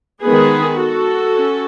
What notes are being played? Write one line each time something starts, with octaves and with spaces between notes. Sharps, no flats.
D#3 G#3 B3 G#4 B4
F#4 A4
C#4